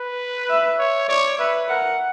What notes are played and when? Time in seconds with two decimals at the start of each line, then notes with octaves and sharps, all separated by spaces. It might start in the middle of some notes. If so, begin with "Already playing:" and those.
Already playing: B4
0.49 E5
0.79 C#5
1.09 C#5 D5
1.38 B4 E5
1.68 A#4 F#5